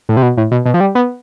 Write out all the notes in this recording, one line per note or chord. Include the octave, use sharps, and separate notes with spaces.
A2
C3
B2
A2
B2
B2
F3
G3
B3